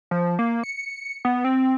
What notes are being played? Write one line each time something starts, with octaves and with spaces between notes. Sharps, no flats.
F3
A#3
C#7
B3
C4